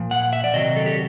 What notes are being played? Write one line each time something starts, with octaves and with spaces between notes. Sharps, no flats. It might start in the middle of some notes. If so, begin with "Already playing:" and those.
Already playing: A#2 F3
F#5
E5
D5
C3 D#3 F#3 D#5
A4
G4